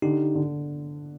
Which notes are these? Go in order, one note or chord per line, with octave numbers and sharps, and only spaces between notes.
D3 D#4 G4
D3